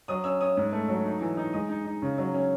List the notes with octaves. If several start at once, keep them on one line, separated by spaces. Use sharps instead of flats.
F#3 D#6
C#4 E6
C#4 D#6
G#2
A3
F#3
D#4
E3
D#4
G#3 D#6
D#4
D#4
C#3
F#3
C#4